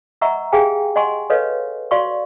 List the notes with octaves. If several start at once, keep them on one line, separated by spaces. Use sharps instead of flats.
D#5 E5 F#5 A#5 C#6 E6
G4 G#4 F5 G5 G#5
D#5 F#5 G#5 C6 C#6
A4 B4 C#5 D#5 F5
F#4 D5 F5 C6 C#6